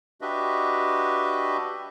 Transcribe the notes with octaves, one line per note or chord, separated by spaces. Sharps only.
D4 F#4 G4 B4 D#5 E5